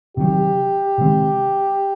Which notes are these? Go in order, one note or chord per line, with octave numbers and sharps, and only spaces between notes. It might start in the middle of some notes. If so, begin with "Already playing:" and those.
C3 D#3 F#3 G4
C3 D#3 G#3 C4